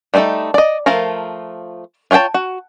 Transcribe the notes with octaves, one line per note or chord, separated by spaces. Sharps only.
G3 A3 C4 D#4 A4
D5 D#5
F3 A3 F4 A#4 A#5
F4 C#5 F#5 G5 A5
F#4